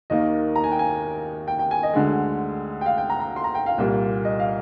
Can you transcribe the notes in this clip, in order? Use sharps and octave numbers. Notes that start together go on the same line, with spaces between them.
D#2 D#3 A#3 D#5
A#5
G#5
G5
G#5
G5
G5
G#5
D#5
D2 D3 G#3
G5
F5
G5
A#5
A#5
C6
A#5
G5
F5
C2 A#2 G3 A#3
D#5
F5